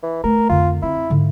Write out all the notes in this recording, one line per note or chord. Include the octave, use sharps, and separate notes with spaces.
E3
A3 A#4
F2 D3 F4
C4 E4
G#2 D3